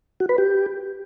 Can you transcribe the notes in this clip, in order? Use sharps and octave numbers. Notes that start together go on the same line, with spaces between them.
F#4
B4
G4